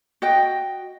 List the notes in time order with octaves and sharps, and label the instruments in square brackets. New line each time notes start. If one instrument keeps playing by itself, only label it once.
[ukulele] F#4 D#5 G5